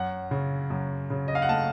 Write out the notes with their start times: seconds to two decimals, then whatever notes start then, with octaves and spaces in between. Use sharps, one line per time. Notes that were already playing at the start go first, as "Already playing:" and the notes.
Already playing: F#2 F#5
0.31 C#3
0.70 F#2
1.10 C#3
1.28 D#5
1.35 F5
1.42 F#5
1.49 A3 A5